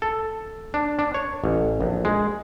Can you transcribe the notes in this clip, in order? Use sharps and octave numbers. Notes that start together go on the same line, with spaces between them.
A4
D4
D4
C#5
A1
A#1
G#3